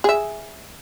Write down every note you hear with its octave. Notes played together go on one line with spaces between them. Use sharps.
G#4 E5